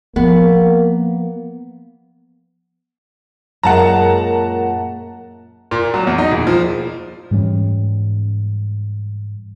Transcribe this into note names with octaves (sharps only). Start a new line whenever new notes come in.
F3 A#3 B3
F#2 A#2 G#3 F#5 A5 A#5
A#2
F#3
E2
D#4
E1
F3
G#2 E3 G3 C#4